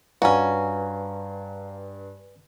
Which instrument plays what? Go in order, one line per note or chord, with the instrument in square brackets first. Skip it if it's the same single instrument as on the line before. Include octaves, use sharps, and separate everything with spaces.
[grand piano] G2 [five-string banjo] C#4 F#4 [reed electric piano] B4 D5 G#5 [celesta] F5 A#5